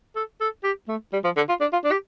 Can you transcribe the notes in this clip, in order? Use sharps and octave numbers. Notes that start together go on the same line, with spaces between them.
A4
A4
G4
A3
G3
F3
D3
F4
D4
F4
D4
G4